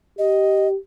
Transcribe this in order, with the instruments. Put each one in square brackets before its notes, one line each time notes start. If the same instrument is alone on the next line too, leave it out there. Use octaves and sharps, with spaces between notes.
[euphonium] G4 [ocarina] D#5